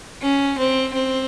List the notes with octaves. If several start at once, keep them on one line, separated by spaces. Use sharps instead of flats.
C#4
C4
C4